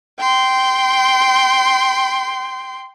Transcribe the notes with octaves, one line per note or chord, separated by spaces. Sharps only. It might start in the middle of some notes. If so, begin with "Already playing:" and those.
G5 C6